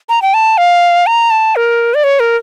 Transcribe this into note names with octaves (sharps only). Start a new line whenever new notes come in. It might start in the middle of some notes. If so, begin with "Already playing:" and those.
A#5
G5
A5
F5
A#5
A5
A#4
D5
C#5
A#4